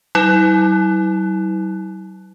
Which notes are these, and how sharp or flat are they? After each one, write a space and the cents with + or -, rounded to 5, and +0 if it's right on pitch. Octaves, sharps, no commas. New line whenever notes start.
F#3 +45 E4 -40